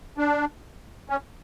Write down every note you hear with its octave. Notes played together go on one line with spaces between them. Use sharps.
D4
C#4